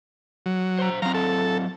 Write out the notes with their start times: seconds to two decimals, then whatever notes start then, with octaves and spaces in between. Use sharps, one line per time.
0.46 F#3
0.79 C5 A#5
1.02 F#3 C4 F5 A#5
1.14 A4